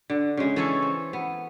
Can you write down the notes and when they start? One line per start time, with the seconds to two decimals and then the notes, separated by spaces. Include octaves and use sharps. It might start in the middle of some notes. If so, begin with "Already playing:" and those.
0.10 D3
0.37 C#3 G#3
0.56 E3 C#4 A4 C#5
0.82 C4
1.13 B3